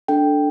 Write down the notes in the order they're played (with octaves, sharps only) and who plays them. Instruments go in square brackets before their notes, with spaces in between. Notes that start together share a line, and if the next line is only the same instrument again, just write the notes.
[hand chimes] D4 A4 G5